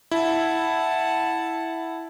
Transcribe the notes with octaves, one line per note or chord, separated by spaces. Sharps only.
E4 F#5 A5